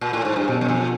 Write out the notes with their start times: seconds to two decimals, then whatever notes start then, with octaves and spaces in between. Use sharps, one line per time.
0.01 A#2
0.13 A2
0.25 G#2
0.36 G2
0.48 F#2 B2
0.61 F#2
0.69 F2 B2